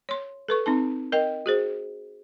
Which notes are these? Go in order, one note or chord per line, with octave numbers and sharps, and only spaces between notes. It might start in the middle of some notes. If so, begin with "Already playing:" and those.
C#5 C6
A4 B4 C#6
C4 D#4 A5
A#4 D#5 G5
F#4 G#4 C5